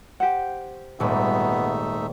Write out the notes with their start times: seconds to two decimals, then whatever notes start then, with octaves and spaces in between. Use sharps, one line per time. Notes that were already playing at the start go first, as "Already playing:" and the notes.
0.20 G4 C5 F#5
1.00 D#1 G#1 A3 B3 D#4 E5